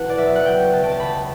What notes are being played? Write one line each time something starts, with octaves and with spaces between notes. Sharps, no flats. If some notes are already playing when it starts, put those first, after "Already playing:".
Already playing: E1 E3 F#5 A5
D5
B1 E5
F#5
C#2 G5
C#2 A5
G5
A5
C#2 B5